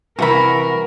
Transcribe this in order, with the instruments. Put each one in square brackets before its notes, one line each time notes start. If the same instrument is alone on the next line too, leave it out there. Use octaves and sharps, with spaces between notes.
[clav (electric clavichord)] C2 E3 E4 [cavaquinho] F#4 B5 [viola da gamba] A#4